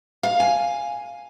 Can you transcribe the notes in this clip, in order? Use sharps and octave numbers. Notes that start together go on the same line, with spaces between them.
F5
G#5